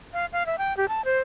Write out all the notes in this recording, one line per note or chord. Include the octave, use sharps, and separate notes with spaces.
F5
F5
E5
G5
G4
A5
C5